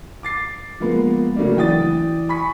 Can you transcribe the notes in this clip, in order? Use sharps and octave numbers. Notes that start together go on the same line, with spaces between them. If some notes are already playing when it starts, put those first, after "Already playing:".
D6 A6 C7
F3 G#3 A#3 B3
C#3 F#3 A3 A#3 D4
E3 D5 G5 D#6 A6
G#5 B5 C#6 B6